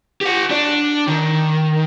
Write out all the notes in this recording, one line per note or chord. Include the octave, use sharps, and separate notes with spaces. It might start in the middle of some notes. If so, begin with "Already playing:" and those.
G4 F#5
D4 D5
D#3